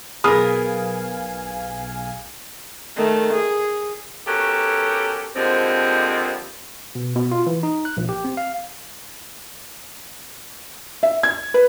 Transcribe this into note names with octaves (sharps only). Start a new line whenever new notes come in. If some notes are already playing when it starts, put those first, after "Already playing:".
B1 B3 G#4 A#4 F5 G#5 D#6 F6
D#3 A3
G#4
B3 C#4 F#4 G4 A4 A#4
D3 F3 G3 G#3 A#3 C4
B2
B2
F4
E3
D#4
F#6
A#1
G4
C4
F5
E5
G#6
B4